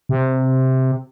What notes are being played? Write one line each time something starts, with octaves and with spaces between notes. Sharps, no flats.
C3